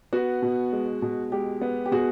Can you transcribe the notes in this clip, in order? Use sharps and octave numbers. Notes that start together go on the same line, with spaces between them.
B3 F#4
B2
G#3
B2
G#3 G4
B3
G4
B2 F#4 G#4